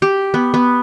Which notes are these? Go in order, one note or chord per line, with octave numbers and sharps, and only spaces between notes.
G4
B3
B3